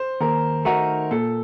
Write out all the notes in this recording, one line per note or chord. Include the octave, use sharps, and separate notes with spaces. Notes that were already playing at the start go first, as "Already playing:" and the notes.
Already playing: C5
D#2 A#4
D#3 A3 D#4 F#4 A#4
A#2 A4